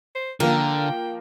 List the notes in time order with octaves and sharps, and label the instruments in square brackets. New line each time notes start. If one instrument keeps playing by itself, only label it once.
[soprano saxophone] C5
[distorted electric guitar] D3 [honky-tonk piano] F3 A#3 [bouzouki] A#4 [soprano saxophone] G5